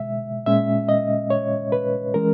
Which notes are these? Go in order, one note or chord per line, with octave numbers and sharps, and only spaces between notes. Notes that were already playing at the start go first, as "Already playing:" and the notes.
Already playing: B2 G#3 E5
A#2 G#3 C#4 E5
D#5
C#5
B4
E3 G#3 C#4 A#4